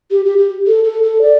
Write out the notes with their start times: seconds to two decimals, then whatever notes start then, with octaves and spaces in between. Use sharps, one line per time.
0.11 G4
0.25 G4
0.38 G4
0.67 A4
0.84 A4
1.02 A4
1.22 D5